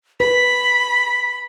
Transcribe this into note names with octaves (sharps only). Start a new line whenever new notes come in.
B4 B5 B6